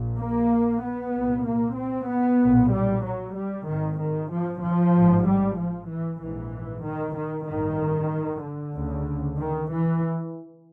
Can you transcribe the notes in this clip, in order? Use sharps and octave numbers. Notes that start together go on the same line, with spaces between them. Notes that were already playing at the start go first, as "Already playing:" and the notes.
Already playing: A#1 A#2
A#3
B3
C2 A#2
A#3
C4
B3
B1 A#2
G3
F#3
G3
G#1 G#2 D#3
D#3
F3
F3
A1 G#2
G3
F3
E3
A#1 G#2 E3
D#3
D#3
A1 G2 D#3
D3
D2 C#3
D#3
E3